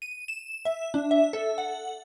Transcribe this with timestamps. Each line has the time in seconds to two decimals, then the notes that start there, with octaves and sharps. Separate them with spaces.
0.02 D#7
0.28 E7
0.65 E5
0.94 D4
1.11 E5
1.33 A4
1.58 F#5